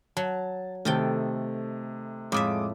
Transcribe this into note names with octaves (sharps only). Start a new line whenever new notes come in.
F#3 A5
C3 D#3 A3 A4 G5
F2 A2 G#3 E5 D6 D#6